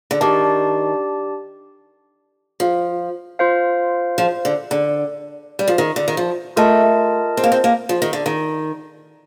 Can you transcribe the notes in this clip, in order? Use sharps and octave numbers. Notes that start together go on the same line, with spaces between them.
D3
D#3 D4 G4 D5 A5
F3
F4 C5 F5
F3
D3
D3
G3
F3
D#3
D3
D#3
F3
A3 F4 A#4 D#5 A5
C4
A#3
C4
A#3
F3
D#3
D3
D#3